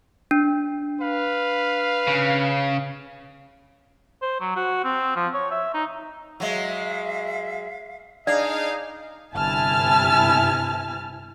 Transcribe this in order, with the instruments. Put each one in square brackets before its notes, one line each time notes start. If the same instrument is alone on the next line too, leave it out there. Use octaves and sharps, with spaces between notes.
[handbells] D4
[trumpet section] B4 F5
[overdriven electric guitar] C#3
[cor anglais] C5
F#3
F#4
C4
F3
C#5
E5
D#4
[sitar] F#3 G#3 [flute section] E5 F5
[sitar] D4 [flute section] D#4 G#4 [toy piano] D5 [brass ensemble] D#5 F5
[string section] G1 C3 E4 G#5 A5 F6